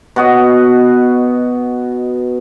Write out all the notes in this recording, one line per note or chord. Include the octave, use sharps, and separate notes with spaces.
B2 F#4 D#5